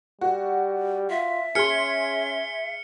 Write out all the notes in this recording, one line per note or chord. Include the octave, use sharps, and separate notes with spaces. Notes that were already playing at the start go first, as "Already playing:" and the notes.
G3 F#4
F4 E5
C#4 G#4 C6 F6 C#7